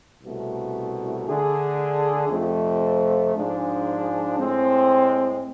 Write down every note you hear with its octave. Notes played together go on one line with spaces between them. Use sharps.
C2 B2 A3
D3 A3 D4 G#4
F2 C3 F3 A3 C4
G#2 F3 G#3 D4 G#4
A2 G#3 C4